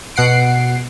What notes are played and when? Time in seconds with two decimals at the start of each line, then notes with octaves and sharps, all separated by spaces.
0.16 B2 F#5 C7 D7